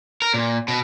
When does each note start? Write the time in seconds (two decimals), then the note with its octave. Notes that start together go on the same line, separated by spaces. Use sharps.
0.22 A#4
0.34 A#2
0.68 B2